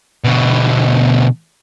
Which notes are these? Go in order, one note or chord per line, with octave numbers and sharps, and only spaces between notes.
B2 D3